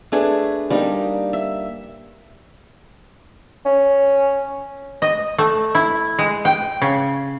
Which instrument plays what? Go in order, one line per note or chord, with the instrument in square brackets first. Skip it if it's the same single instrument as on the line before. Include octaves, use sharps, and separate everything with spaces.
[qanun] A3 D4 G#4 B4
G3 A#3 D4 D#4
E5
[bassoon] C#4
[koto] D#5
A3
E4
G#3
G5
C#3